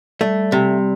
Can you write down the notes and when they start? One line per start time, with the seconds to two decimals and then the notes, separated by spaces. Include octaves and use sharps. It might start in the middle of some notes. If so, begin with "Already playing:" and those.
0.21 G3 A3
0.52 C3